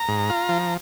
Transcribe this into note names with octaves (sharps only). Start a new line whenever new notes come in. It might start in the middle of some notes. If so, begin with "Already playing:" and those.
Already playing: A#5
G#2
F4
F3